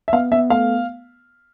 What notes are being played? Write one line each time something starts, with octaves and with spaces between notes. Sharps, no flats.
E5
B3 F5
B3 E5
A3 F5